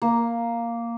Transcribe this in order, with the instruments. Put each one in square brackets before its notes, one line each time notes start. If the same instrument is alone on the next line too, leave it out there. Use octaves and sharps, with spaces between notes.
[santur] A#3